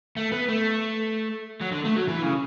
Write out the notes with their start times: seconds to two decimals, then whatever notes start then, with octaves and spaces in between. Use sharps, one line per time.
0.17 A3
0.32 B3
0.49 A3
1.61 F#3
1.72 D3
1.85 A3
1.96 F#3
2.08 E3
2.22 C#3